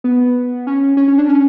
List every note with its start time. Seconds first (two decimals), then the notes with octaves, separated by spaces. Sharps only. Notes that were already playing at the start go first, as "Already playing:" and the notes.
0.04 B3
0.67 C#4
0.97 C#4
1.08 C#4
1.18 D4
1.29 C#4